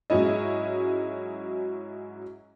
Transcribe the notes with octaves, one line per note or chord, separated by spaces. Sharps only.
G#2 F#3 C#4 E4 D#5